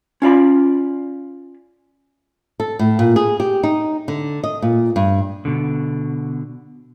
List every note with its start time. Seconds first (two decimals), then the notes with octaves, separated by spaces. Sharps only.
0.22 C#4 F4 D5 B5
2.60 A4
2.79 A2
2.99 A#2
3.16 G#4
3.40 G4
3.63 D#4
4.08 D3
4.44 D#5
4.62 A#2
4.96 G2
5.45 B2 D3